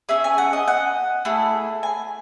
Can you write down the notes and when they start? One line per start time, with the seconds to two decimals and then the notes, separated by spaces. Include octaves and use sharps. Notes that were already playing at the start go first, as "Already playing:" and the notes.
0.09 C#4 G#4 E5
0.24 G#5
0.38 F#5
0.53 D#5
0.68 F#5
1.25 A3 E4 G#4
1.83 G#5